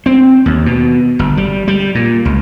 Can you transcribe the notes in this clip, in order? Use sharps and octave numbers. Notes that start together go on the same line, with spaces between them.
C4
D#2
B2
G1
G3
G3
A#2
C#2